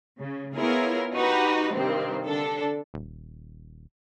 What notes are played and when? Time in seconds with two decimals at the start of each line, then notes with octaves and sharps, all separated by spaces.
0.18 C#3
0.56 B3 E4 F4 G#4 A#4 C#5
1.14 D#4 F#4 G4 B4
1.73 G2 C3 D#3 C4
2.26 D3 D4 A4
2.94 D#1